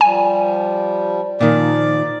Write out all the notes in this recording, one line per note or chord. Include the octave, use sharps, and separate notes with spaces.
F3 G3 G#5
A#2 D#3 F3 D5